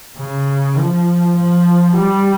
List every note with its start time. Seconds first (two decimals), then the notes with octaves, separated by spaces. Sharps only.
0.18 C#3
0.77 F3
1.36 F3
1.96 G3